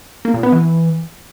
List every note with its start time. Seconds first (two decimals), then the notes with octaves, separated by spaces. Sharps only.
0.25 A#3
0.34 A#2
0.43 B3
0.52 E3